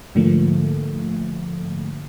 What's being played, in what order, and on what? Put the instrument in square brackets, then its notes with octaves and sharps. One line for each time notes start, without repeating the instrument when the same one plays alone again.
[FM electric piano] G#2 D3 F3 A3 A#3